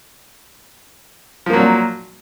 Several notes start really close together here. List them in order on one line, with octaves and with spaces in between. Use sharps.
F3 A#3 F#3 A#2